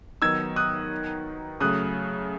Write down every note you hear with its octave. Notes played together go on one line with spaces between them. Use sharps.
D#3 F#3 B3 D#4 E6 G#6
D#6 F#6
C#3 F#3 A3 D#6 F#6